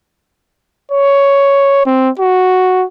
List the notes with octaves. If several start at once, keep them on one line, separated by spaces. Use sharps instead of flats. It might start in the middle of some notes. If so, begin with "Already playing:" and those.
C#5
C4
F#4